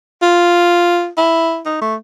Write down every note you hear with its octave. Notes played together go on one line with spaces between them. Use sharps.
F4
E4
D#4
A3